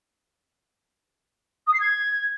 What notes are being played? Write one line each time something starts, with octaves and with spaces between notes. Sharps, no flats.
D#6
C7
G#6